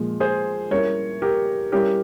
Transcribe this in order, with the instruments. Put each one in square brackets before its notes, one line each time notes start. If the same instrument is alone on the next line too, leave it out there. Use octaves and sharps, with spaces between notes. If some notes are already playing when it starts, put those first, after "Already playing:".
Already playing: [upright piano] A#2 F3 G#3
[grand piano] G#4 C5
[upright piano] G3 C#4 E4 [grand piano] A#4 C#5
[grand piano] G4 A#4
[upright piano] G3 C#4 E4 [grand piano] G4 A#4